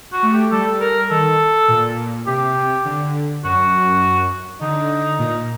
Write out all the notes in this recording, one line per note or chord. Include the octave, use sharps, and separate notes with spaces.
F#4
A3
G4
G3 A4
A#4
D#3 A4
A#2
C3 G4
D3
F#2 F#4
D3 D#4
A#2